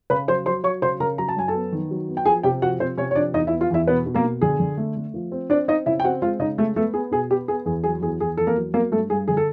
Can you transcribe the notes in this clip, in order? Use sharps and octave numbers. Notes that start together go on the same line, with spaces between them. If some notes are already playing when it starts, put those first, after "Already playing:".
C#3 B4 B5
F#3 C5 C6
F#3 C5 C6
F#3 C#5 C#6
C#3 C5 C6
C#3 A#4 A#5
F#3 A#5
A5
F#2 G#5
A4 A5
B3
D#3
F#3
B3
G5
F3 G#4 G#5
C3 G4 G5
F3 F#4 F#5
C3 C4 C5
C3 C#4 C#5
C#5
F3 D4 D5
E2 D#4 D#5
E4 E5
B3
F4 F5
E2 E4 E5
B2 B3 B4
B2
A#3 A#4
B2
D3 G#4
D3
A3
A3
F3
C4
C4 D4 D5
C4 D#4 D#5
C#3 E4 E5
G5
C4 F#4 F#5
G#3 F4 F5
C#3 D#4 D#5
G#3 A3 A4
A3 B3 A4
B3 G#4
B2 G#4
B3 G4
B3 G#4
E2 G#4
F#3 G#4
E2 G#4
E2 G#4
E2 A4
A#3 A#4
F#3
F#3 A#3 A#4
G2 A3 A4
G2 G#4
D3 G#4
A4